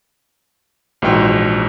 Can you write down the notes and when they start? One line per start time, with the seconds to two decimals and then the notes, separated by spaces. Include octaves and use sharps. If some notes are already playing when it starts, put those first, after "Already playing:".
1.02 A#1 G#2 E3 F#4 G5 C6